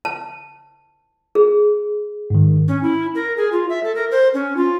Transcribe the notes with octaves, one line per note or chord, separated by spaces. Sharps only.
A5
G#4
G#2 D#3
C#4
E4
A#4
G#4
F4
E5
A4
A#4
C5
C#4
F4